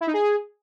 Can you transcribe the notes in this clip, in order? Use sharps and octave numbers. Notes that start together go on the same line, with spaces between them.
E4
D#4
G#4